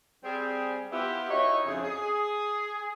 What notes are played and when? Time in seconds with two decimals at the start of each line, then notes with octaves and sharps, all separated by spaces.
0.23 G3 C4 G#4
0.91 B3 E4 F4 G4
1.30 D#4 E4 F#4 C#5 D#5 E5
1.65 F2 C#3 G#4
1.83 G#4